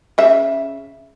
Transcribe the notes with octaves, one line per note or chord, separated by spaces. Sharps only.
C#3 E5